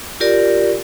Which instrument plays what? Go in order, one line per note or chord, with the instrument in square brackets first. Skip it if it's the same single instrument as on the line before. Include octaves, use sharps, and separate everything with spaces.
[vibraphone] F4 G4 A#4 D5